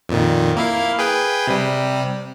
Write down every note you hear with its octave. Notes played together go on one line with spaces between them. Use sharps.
F2 A#2 D#3
A#3 E4 F5
G#4 B4 G5
C3 G3